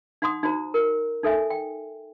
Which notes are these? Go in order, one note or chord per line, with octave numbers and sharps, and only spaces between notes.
D#4 F#5 C6 D#6
D#4 F#4 C5 A#5
A#4
D#4 A4 E5 G#5
G5